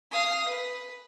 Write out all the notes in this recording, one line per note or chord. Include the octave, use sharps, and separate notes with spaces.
F5 D#6
B4